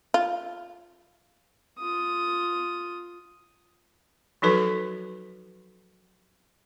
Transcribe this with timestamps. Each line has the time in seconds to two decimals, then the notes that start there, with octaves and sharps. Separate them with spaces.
0.14 F4
1.79 F4 D#6
4.42 F3 F#3 D#4 F#4 A4 B4